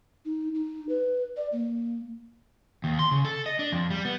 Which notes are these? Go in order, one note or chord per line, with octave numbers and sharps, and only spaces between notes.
D#4
D#4
B4
D5
A#3
D#2
C6
C#3
A4
D#5
D4
F2
G3
B3